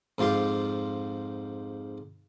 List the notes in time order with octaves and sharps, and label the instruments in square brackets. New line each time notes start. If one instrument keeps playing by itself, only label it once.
[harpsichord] F2 G#2 F4 G4 C6